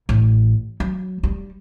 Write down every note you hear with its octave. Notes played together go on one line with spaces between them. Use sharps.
A1
F#3
G3